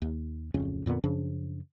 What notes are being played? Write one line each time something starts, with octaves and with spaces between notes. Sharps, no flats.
D#2
D1 F2 C#3 C#4
F2 A#2 D3 B3
F#2 C#3 F3 D4